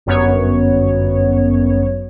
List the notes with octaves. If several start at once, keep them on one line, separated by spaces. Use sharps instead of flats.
G1 F#2 B3 C#5